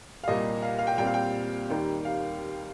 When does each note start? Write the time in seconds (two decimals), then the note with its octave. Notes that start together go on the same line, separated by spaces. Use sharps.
0.23 F5
0.28 C2 A#2 G3 A#3 D#5
0.62 F5
0.78 F5
0.87 G5
0.98 A#2 G3 C4 G5
1.07 F5
1.14 G5
1.70 D#2 D#3 G3 A#3
2.05 F5